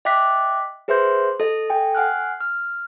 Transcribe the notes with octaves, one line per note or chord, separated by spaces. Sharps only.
D#5 E5 G5 D6 F#6 B6
G#4 B4 C5 E5 C6 G6
A4 D#5
A4 G5 G#5
F#5 G#5 F6 F#6
F6